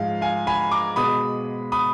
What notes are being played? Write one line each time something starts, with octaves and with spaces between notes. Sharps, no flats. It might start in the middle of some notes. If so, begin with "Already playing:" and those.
Already playing: G#2 F3 G#3 F5
F5 G#5
G#5 B5
A#5 D6
B2 G#3 B5 D#6
B5 D#6